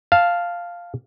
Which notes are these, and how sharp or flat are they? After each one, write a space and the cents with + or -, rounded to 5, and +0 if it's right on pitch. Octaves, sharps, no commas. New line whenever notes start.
F5 +0 A5 +0